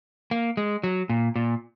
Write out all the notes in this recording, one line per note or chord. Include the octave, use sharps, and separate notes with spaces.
A#3
G#3
F#3
A#2
A#2